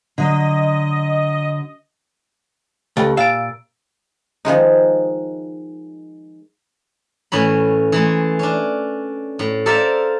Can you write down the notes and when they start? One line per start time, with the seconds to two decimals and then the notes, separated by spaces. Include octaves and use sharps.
0.18 D3 F#3 D#5
2.97 C#2 A3 G4 A5
3.17 A#2 F5 E6 A6 D7
4.45 D#3 F3 G#3 D#4
7.32 A2 E3 C#4 B5
7.92 E3 G#3 A3
8.39 C#4 D4
9.39 A2
9.66 A4 A#4 C5 D5 E5 F5